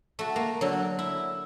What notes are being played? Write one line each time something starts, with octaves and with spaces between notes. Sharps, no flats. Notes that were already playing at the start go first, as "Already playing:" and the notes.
A3 F#4
A#3
D3 F#3
E4